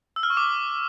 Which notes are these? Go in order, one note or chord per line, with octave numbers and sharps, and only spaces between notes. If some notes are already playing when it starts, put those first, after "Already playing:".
E6
F6
C#6
D6